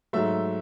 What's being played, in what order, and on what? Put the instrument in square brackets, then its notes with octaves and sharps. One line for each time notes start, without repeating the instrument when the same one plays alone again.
[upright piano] G#2 F#3 A3 E5